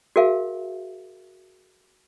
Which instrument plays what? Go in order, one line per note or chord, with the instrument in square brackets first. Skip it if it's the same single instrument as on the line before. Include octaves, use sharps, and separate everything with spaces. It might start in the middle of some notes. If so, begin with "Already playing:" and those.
[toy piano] F#4 G#4 A#4 E5 F5